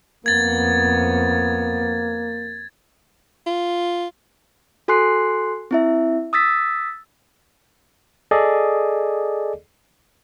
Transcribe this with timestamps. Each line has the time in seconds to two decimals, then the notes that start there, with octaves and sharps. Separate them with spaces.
0.26 F2 A#3 B3 G#6 A6
3.47 F4
4.88 F#4 A4 G#5 C6 F#6 C7
5.71 C4 E4 E5
6.33 D#6 E6 A6 B6
8.31 G#4 A4 D5 D#5